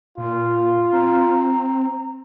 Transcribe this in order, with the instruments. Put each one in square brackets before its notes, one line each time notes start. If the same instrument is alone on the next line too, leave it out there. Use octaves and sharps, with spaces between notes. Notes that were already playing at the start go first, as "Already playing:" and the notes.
[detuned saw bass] A#2 [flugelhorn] F4
[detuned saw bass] C4 [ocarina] A#5